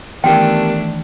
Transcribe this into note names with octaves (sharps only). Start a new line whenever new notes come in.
D#3 E3 A3 B3 D4 G4 A#4 G5